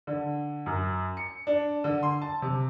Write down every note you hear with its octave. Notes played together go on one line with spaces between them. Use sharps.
D3
F#2
C#7
D4
D3
C6
A5
C3